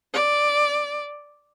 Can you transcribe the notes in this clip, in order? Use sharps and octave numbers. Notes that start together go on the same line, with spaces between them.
D5